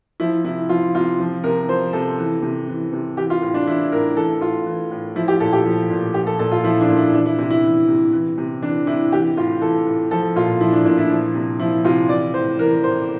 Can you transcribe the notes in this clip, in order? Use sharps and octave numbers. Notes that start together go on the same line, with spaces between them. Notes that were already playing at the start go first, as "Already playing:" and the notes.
F3 E4
C3 E4
F3 F4
C3 F4
F3
C3 A#4
F3 C5
C3 A4
E3
C3
E3
C3
E3 G4
F4
A2
D4
E3 E4
A2 A#4
E3 A4
A2 F4
E3
A2
F3 E4
G4
A#2 A4
G4
F3
A#2
F3 G4
A4
A#2 A4
F4
F3 E4
D4
A#2
E4
E3 D4
E4
C3 E4
E4
E3
C3
E3
C3
E3 D4
C3 E4
E3 G4
A2 F4
E3 A4
A2
F3 A4
A#2 F4
F3 E4
D4
A#2 D4
E4
F3
C3
F3 E4
C3 F4
E3 D5
A2 C5
E3 A#4
A2 C5